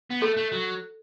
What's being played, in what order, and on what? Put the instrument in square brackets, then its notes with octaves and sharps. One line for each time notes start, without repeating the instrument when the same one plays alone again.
[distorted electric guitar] B3
[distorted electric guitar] A3 [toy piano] A4
[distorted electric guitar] A3
F#3